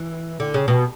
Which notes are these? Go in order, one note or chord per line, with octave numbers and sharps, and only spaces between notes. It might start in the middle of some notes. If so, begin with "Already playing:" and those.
Already playing: E3
D3
C#3
B2